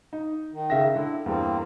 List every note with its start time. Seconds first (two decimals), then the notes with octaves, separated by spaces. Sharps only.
0.13 D#4
0.52 D#3
0.70 C#3 E5 A#6
0.96 D3 E4
1.26 E2 G2 G3 A#3 C4